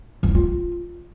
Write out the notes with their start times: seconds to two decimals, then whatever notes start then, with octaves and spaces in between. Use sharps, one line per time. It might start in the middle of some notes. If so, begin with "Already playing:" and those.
0.23 F3
0.29 E4
0.35 F4